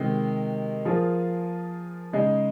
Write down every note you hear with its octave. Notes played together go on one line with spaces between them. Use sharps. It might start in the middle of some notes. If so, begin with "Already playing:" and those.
Already playing: C3 D#3 G#3
F3 A#3 F4 G#4
C#3 G#3 D#4 G#4